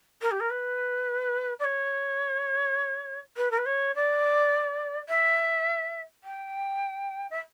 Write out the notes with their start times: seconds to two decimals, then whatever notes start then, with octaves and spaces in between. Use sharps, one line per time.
0.21 A#4
0.31 G4
0.40 A#4
0.50 B4
1.59 D5
1.64 C#5
3.36 B4
3.50 A#4
3.57 B4
3.65 C#5
3.95 D5
5.08 E5
6.23 G5
7.30 E5